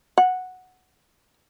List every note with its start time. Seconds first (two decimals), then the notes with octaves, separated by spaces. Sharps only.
0.18 F#5